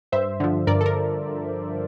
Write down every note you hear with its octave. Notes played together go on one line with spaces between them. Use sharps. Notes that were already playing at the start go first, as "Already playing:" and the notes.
G2 C5 E5
D3 F3
G2 A#4 D5
A4
A#4